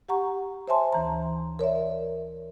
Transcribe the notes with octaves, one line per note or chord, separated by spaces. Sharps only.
G4 F#5 A#5 C#6
C5 C#5 E5 G#5 A5 C6
D2 E3 A#5
A#4 C#5 D5 E5